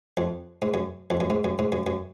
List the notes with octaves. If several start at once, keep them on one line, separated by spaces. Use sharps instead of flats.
F2
G#2
F#2
F2
F#2
G#2
F#2
G#2
F#2
F#2